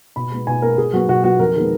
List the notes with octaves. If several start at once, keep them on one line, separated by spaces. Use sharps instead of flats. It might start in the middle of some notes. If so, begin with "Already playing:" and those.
B2 B5
G#3 B3
B2 G#5
G#3 B3 A#4
B2 G#4
F#3 B3 F#4
B2 F#4
F#3 B3 F#4
F2 A#4
D#3 G#3 B3